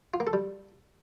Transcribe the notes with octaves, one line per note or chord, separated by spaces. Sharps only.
F4
A#3
A4
G3